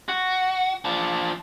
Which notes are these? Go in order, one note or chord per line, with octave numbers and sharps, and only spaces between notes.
F#4
F3 D4